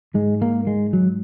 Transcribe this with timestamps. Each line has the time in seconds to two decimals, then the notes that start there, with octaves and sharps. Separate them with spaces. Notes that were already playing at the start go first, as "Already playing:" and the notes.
0.14 G#2 G#3
0.42 A#3
0.67 G#3
0.93 F#3